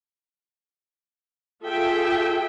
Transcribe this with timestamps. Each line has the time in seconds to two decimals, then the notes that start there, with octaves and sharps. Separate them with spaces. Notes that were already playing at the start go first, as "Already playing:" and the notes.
1.63 F4 G#4 A4 E5 G5